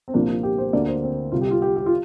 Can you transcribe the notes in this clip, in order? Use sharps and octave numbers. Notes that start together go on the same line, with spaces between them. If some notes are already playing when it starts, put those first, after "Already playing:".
C4
C2 A#2 F3 A#3 D4
F4
G4
C5
D2 D3 A#3 D5
C5
C4
C2 C3 G3 F4
G4
F4
G4
G4
F4